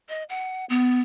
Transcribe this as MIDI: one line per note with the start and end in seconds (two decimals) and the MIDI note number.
0.09 0.23 75
0.29 0.65 78
0.69 1.02 59